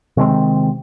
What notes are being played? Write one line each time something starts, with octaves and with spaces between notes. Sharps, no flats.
C3 D#3 G#3 C4